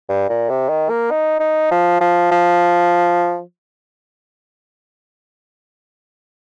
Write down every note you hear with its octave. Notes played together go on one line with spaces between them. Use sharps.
G2
A#2
C3
D#3
A#3
D#4
D#4
F3
F3
F3